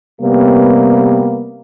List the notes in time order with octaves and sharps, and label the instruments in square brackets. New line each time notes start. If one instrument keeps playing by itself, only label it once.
[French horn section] C3 G3 A#3 B3